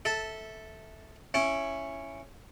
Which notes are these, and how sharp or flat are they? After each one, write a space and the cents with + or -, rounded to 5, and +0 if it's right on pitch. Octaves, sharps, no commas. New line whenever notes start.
A4 +0 E5 -15 A5 +0
C#4 -5 E4 +15